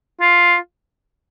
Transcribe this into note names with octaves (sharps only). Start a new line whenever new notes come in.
F4